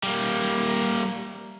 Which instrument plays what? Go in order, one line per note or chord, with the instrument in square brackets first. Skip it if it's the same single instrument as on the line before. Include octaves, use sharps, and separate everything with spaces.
[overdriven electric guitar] G3 A#3